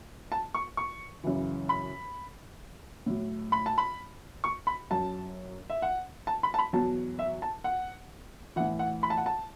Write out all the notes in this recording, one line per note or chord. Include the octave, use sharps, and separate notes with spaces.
A5
C#6
C#6
F#2 C#3 E3
B5
A2 F#3
B5
A5
B5
C#6
B5
F#2 F#3 A5
E5
F#5
A5
B5
A5
B5
E2 B2 F#3 A5
E5
A5
F#5
A2 E3 F#5
F#5
B5
A5
F#5
A5